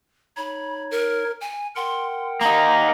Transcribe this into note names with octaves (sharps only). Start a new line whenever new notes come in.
D#4 C#5 B5
A#4
G#5
A#4 F#5 G5 C6
A#3 D#4 A#5